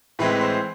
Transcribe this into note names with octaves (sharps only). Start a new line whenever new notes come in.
A2 E3 G#3 C4 B4
C5